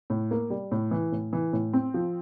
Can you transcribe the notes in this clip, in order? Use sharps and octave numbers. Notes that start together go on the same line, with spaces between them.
A2
A#3
G3
A2
E3
A2
E3
A2
C4
F3